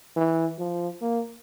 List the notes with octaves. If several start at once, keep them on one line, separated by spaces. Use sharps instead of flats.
E3
F3
A#3